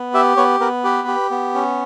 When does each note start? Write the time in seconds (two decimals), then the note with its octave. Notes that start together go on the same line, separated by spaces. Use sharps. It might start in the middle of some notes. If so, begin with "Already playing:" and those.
Already playing: B3
0.14 G4 E5
0.37 B3 C#5
0.60 B3 A#4
0.84 G4 B4
1.08 G4
1.31 B3
1.54 C#4